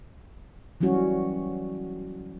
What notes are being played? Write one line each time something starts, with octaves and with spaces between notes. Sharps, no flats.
E3 F#3 G3 C#4 F#4